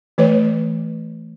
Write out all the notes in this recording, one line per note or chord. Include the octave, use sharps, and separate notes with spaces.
E3 A3 B4 C#5